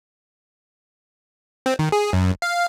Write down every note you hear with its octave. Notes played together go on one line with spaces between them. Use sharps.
C4
D#3
G#4
F#2
F5